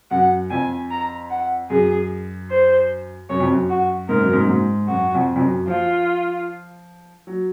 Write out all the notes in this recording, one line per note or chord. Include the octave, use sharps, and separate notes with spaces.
F#2 F#5
F2 G#5
A#5
F#5
F#2 G#4
C5
F#2 C#5
F2
F#2
F#4
G#2 A#4
F#2
G#2
F#2
G#2
F#2 F#4
F2
F2
F#2
F3 F4
F#3